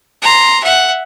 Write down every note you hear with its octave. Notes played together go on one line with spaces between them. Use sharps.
A#5 C6
E5 F#5